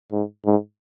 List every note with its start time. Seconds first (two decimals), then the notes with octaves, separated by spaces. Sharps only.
0.12 G#2
0.45 G#2